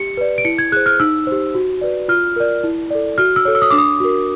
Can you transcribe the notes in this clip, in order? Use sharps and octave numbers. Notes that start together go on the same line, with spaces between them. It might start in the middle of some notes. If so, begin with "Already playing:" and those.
Already playing: G4 C#7
B4 D5
D7
E4 C#7
G#6
G#4 C5 F#6
F6
D#4 E6
G4 C5
F#4
B4 D5
F4 F6
A#4 D5
E4
A4 D5
F#4 F6
E6
A4 C#5
E6
D#6
D4 D6
D#6
F#4 A#4